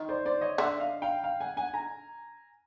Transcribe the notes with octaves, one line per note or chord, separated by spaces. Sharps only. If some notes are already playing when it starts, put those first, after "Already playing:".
Already playing: D#3
C5 D5
C5 D5
C#5 D#5
D3 E5 F#5
D#5 F5
F5 G5
F5 G5
F#5 G#5
F#5 G#5
G#5 A#5